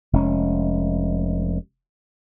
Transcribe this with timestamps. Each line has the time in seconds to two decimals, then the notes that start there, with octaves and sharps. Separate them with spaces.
0.13 F1 G#3 C#4